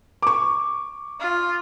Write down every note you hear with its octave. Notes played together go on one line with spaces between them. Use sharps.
C#6 D6
F4